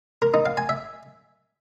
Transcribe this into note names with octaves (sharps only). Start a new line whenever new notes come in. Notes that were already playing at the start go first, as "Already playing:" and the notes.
A#4
D#4
F5
G#5
E5